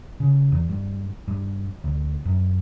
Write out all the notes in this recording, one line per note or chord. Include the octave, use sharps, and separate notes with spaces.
C#3
E2
G2
G2
D2
F#2